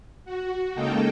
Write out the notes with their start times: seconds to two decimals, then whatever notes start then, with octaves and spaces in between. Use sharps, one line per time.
0.25 F#4
0.75 C#3 G#3 A#3 D#4 A4 G5